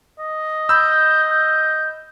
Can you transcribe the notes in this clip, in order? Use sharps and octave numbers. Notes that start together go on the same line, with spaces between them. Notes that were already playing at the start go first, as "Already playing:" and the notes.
D#5
B5 E6 G6
G6